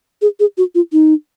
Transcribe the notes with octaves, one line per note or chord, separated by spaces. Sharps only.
G#4
G#4
F#4
F4
D#4